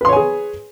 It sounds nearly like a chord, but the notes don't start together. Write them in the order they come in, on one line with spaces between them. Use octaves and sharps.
B4 C6 C#5 G#5 G#4